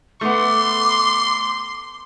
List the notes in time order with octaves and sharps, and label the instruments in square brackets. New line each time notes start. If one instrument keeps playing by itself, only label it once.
[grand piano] A3 B3 [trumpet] C6 [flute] D6